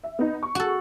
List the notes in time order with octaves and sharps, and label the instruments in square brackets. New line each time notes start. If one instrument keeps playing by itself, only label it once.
[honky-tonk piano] E5
B3 D#4
C#6
[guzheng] F#4 A4